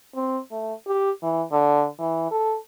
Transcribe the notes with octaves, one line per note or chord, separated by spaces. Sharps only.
C4
A3
G4
E3
D3
E3
A4